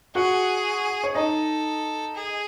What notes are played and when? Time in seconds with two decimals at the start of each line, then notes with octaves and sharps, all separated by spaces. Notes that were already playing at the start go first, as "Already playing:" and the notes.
0.15 F#4 G#4 F#5
1.04 C#5
1.15 D#4 A4 D#5
2.16 G#4